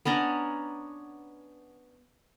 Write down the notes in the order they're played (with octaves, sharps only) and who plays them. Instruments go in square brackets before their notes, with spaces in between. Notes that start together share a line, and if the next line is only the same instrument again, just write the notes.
[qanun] B3 C#4 D4 A#5